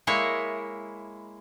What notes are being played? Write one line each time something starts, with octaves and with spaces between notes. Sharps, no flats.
G#3 A#3 E4 C#5